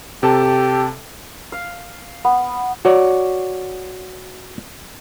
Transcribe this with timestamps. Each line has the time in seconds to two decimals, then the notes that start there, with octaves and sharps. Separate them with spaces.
0.23 C3 G4 A4 A5
1.52 F5
2.25 B3
2.85 F#4 C#5 D5